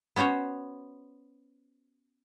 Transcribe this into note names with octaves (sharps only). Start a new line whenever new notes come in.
B3 C#4 F#4 C5 C#5